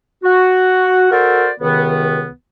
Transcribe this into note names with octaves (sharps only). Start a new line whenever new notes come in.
F#4
F#4 A4 A#4 C5 D5
C#2 C3 D#3 B3